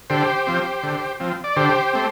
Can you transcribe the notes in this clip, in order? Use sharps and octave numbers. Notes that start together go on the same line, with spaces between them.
D3 G4 C5
F3 C4
D3
F3 C4
D5
D3 G4 C5
A3 C4